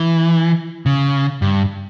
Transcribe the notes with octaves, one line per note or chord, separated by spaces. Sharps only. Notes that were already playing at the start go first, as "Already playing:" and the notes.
Already playing: E3
C#3
G2